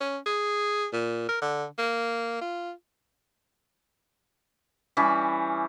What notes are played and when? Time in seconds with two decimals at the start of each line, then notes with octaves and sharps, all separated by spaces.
0.01 C#4
0.26 G#4
0.93 A#2
1.29 A#4
1.42 D3
1.78 A#3
2.41 F4
4.97 E3 G3 C#4